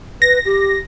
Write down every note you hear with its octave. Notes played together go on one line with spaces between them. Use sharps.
B4 A#6
G4